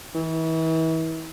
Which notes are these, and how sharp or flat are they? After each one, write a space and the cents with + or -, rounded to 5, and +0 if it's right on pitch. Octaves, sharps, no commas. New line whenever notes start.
E3 -35